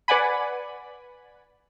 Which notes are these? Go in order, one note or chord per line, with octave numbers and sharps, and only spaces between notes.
B4 D5 F#5 G#5 B5